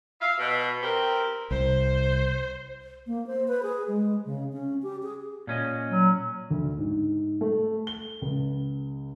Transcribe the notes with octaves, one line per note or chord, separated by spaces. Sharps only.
E5 F5
B2
C4 G4 A#4
C2 C5
A#3
C5
B4
G#4
G#3
C#3
C#4
G4
G#4
A#2 C#4 D#5
F#3
D2
G#2
A3
G7
C#2